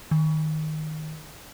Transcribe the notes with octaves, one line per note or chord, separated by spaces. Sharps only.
D#3